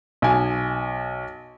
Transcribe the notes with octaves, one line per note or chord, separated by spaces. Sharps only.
B1 G#5